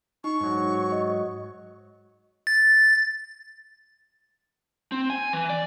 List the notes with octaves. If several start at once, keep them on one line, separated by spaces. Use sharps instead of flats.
D#4 C#6
G#2 F#3
D#5
A6
C4
G#5
E3
D5